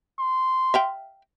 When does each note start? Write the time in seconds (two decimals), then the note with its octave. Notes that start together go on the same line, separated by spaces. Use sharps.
0.19 C6
0.74 E5 F5 G5